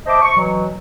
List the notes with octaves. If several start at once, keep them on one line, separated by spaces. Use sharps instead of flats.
C5 D#5 E5 A5 D6
C#6
B2 E3 F#3